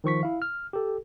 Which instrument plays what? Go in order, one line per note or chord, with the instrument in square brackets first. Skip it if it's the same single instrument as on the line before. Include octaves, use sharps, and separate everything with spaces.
[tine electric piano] D#3 F3 C#6 B6
E4 F5
F6
G4 A4